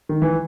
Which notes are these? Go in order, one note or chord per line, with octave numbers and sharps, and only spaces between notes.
D#3
E3